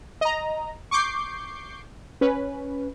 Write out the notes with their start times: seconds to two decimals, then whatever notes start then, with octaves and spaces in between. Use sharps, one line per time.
0.21 D#5 A#5
0.91 C#6 D6 G6 C7
2.21 C#4 B4